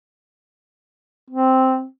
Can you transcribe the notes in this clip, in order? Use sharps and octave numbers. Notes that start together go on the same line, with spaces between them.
C4